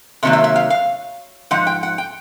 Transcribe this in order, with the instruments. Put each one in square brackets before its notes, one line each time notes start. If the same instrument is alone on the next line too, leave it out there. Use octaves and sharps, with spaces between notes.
[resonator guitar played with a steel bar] C3 D#3 F#3 A#3 E5
E5
E5
F5
F5
G#2 F3 F#5
G5
F#5
G5